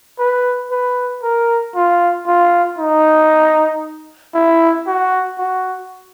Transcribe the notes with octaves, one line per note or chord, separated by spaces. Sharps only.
B4
B4
A#4
F4
F4
D#4
E4
F#4
F#4